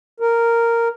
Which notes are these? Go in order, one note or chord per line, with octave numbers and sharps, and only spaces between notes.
A#4